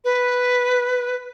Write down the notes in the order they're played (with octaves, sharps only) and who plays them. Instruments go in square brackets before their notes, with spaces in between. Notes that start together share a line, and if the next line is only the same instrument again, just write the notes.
[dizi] B4